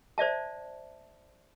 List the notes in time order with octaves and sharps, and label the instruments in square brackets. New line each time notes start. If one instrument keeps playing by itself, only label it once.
[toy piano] C5 D5 E5 A5